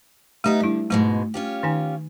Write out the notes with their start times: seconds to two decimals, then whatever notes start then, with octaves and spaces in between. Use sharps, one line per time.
0.44 A3 B3 D#4 E4 G4
0.60 D3 G3 E4
0.90 G#2 B2 G#3 A3
1.34 C#4 F4 G4
1.63 D#3 D#4 G#5